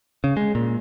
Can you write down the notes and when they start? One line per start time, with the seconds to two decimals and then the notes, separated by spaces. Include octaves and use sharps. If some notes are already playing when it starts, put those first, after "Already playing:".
0.24 C#3
0.37 G#3
0.55 A#2